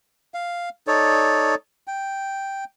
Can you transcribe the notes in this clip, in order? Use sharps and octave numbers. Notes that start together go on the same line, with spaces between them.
F5
D#4 A4 C#5 D5
G5